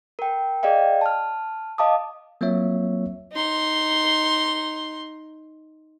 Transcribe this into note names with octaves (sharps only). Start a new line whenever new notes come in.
A#4 G5
G#4 D5 D#5 F5 G5
A5 F6
D#5 F5 A5 D6 D#6
F#3 A#3 C4 F4 C#5 E5
D#4 C6